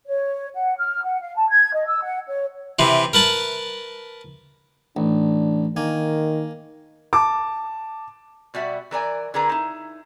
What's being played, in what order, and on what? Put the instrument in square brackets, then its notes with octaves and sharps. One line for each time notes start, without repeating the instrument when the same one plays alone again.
[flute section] C#5
F#5
F6
F#5
F5
A5
G#6
D#5
E6
F#5
C#5
[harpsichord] C3 E3 C4
A#4 B4 A5 B5
[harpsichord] A1 [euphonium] D4
[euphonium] D#3 [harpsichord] A#3 G#5
[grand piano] A5 D6
[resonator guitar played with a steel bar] B2 G3 F#4 E5
E3 A#4 D5 G#5
D3 G#4 A#4 B4 A#5
D#4 E4